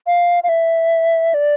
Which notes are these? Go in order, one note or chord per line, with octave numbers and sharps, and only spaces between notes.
F5
F5
E5
D5